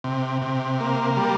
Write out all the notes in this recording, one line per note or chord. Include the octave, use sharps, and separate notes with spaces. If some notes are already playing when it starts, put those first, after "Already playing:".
C3
C3
A#3
G3